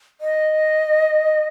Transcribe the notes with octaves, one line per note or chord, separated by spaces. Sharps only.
D#5